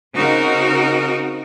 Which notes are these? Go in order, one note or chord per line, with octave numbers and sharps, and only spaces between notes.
C#3 C4 D#4 F#4 A#4